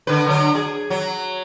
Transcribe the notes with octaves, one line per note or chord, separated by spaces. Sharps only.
D3 B4
D3 F#3
G#4
F#3